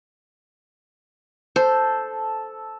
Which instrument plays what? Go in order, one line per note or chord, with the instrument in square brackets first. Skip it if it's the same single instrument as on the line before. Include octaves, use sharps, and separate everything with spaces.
[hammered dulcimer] A4 [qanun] C5